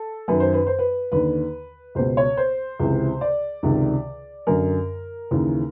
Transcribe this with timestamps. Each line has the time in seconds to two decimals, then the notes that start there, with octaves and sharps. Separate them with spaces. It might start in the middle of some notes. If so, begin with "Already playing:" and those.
Already playing: A4
0.28 F#2 D#3 B4
0.40 C5
0.53 B4
0.67 C5
0.79 B4
1.12 D#2 D3 B4
1.95 C#2 B2 C5
2.17 C#5
2.37 C5
2.80 C#2 C3 E3
3.21 D5
3.63 C#2 C3 D#3
4.47 F#2 D3 A#4
5.31 D#2 C#3 E3